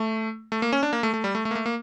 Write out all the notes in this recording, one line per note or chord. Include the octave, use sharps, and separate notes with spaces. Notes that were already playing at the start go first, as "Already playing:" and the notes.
Already playing: A3
A3
A#3
C#4
D4
A#3
A3
A3
G3
A3
A3
A#3
A3
A#3